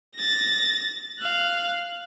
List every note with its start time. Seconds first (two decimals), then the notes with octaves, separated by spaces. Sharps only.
0.15 A6 A#6
1.19 F5 F#6